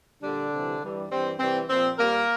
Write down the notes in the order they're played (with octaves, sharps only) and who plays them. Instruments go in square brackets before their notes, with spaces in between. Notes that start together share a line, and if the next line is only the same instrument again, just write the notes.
[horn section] A#2 D3 G3 D4
C3 E3 G3
G2 E3 G3
G2 E3 G3 C4
C3 E3 G3 C4
A#2 F3 C4
A#2 G3 A#3 A#4